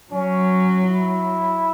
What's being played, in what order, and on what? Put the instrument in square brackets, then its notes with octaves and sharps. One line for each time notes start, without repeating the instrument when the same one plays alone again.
[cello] F#3 [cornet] C#4
[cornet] E4